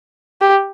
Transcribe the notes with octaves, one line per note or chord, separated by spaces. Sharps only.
G4